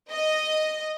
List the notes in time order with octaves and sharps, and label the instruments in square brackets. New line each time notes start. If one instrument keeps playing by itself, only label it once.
[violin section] D#5